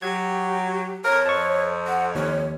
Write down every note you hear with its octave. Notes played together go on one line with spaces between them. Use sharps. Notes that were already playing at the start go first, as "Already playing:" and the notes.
F#3 G4 G#6
F2 A#4 C#5
F2 A5 C#6
F#5
D#2 C#5